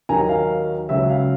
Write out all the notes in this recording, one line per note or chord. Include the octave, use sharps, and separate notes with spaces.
D#2 D#3 F#3 G#5 A#5
F5
C#2 C#3 F#3 E5
F5